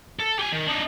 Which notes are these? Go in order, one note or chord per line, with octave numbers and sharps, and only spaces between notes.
A4
G4 G#5
D#3
D4 D#4